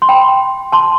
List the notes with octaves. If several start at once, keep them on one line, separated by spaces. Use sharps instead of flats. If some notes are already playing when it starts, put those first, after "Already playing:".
C6
G5 B5
A5 C6